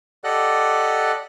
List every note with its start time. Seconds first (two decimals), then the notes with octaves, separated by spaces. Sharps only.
0.24 G4 A4 D5 D#5 F#5 F#6